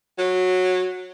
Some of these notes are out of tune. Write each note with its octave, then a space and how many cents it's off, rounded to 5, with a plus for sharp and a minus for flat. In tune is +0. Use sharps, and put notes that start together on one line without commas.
F#3 -10